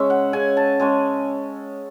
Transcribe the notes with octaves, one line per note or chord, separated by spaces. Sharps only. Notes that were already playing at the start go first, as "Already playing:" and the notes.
Already playing: C#3 G#3 C#4 E5
F#5
C#3 G#5
A5
G#3 C#4 G#5